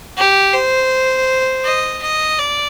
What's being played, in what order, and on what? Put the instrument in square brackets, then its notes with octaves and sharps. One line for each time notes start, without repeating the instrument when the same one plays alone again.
[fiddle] G4
C5
D#5
D#5
D5